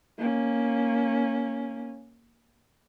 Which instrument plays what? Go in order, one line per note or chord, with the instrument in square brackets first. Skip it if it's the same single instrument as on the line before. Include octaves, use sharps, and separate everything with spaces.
[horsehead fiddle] A#3 C#4